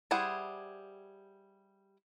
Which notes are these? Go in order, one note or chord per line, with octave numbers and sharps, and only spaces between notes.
G3 E4 G#4 C5 F#5